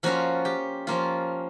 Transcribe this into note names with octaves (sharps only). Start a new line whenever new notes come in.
F3 A#3 C#4 F4 F#4
G4
F3 A#3 C#4 F4